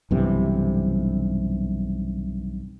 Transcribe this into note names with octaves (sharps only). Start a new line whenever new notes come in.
B1 G2 C3 E3